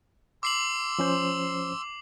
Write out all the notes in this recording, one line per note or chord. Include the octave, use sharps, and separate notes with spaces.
C6 D6 E6 C7 F#7
F3 C#4 C5